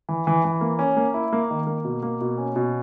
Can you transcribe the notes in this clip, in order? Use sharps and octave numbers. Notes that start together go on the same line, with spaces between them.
E3
E3
E3
A#3
C#4
A#3
E4
A#3
D#3
A#3
B2
A#3
B2
C#4
B2